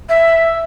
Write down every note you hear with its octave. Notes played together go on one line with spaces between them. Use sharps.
E5